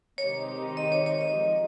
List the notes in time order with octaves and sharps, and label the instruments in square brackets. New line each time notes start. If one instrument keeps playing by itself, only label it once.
[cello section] C3 D#3 G#3 D#4 G4 [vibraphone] C#5
[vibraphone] D#5
C#5
C#5
D#5
[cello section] F3 G#3